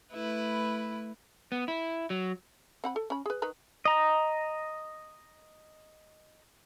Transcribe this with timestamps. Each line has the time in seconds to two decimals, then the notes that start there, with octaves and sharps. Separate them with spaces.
0.13 A3 E4 B4
1.52 B3
1.68 E4
2.10 F#3
2.84 C4 F#5 B5
2.96 A4
3.10 C#4 B5
3.26 G#4 B4
3.42 D#3 B4 A#5
3.85 D#5 A#5